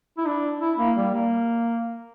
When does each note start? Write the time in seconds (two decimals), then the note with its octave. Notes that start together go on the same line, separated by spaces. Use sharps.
0.18 E4
0.26 D4
0.61 E4
0.79 A#3
0.96 G3
1.14 A#3